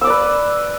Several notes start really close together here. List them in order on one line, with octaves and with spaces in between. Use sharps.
E6 D6 D5 B4